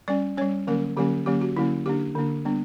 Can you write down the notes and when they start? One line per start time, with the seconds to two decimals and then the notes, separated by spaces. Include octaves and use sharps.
0.08 G3 C#4 D5
0.37 G3 C#4 C#5
0.67 D3 F#3 A#3 C#4 A#4
0.97 D3 F#3 A#3 C#4 G4
1.26 D3 F#3 A#3 C#4 G4
1.41 F#4
1.56 D3 F#3 A#3 C#4 E4
1.86 D3 A#3 D4 G4
2.16 D3 A#3 D4
2.45 G3 B3 D4